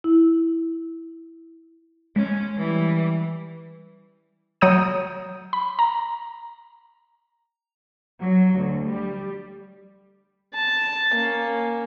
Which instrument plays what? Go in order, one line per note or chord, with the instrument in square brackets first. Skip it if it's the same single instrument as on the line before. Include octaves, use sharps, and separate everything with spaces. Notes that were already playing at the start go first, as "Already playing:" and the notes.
[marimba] E4
[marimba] G#3 [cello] C#4
[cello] E3 G3
[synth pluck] F#3 C#5 A#5 D#6 G6 D#7
B5
A#5
[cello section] F#3
D2
G3
[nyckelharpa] A5
A#3 C#4